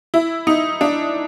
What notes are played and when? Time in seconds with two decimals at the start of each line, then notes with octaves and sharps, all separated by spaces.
0.14 E4
0.47 D#4
0.81 D4